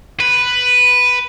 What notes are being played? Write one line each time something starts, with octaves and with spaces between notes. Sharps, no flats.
B4